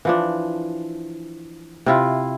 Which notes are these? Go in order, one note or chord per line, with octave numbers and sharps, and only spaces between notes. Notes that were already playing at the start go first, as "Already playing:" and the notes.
E3 F3 D4
C3 E4 F4